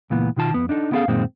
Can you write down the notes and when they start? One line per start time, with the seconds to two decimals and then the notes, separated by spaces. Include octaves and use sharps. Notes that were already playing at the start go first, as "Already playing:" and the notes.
0.10 C#2 A#2 E3 B3
0.37 B2 D#3 F4 A5
0.54 F2 B3
0.69 D4 D#4 A4
0.92 B3 C#4 E4 G#4 A4 F5
1.08 F#2 A#2 D#3 G#3 C4